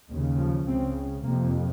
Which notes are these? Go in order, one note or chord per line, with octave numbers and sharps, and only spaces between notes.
D#2 C#3
F3
C#2 C#3 C4
F2 C3 A#3